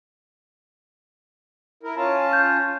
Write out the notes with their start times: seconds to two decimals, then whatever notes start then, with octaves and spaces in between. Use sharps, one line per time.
1.83 E4 A#4
1.96 C#4 F4 A5
2.33 G6